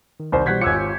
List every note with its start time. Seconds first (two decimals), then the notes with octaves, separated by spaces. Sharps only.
0.20 D#3
0.32 C2 D#3 C5
0.46 B2 E3 G3 C5 F#5 C#6 G#6 B6
0.61 G#1 F4 G4 C#5 G#5 E6 C#7